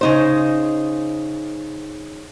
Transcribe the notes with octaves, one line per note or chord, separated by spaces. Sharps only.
C#3 D#4 C5